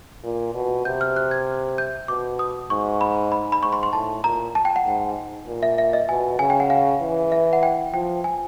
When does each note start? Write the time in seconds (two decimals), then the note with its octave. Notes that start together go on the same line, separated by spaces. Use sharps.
0.24 A#2
0.54 B2
0.85 C3 G6
1.01 F6
1.16 F#6
1.31 G#6
1.78 G6
2.08 B2 D6
2.39 D#6
2.70 G#2 C#6
3.01 B5
3.32 B5
3.52 B5
3.62 G#2 C#6
3.73 C6
3.83 C6
3.93 A2 A5
4.24 A#2 A#5
4.55 A5
4.65 G5
4.76 F#5
4.86 G#2
5.47 A#2
5.63 E5
5.78 E5
5.93 D#5
6.09 B2 G#5
6.39 C#3 G#5
6.50 G5
6.60 F#5
6.70 F5
7.01 E3
7.32 E5
7.53 F#5
7.63 G5
7.93 F3 G5
8.24 G#5